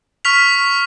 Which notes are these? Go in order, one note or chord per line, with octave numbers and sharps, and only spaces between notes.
C#6 F6 B6 F7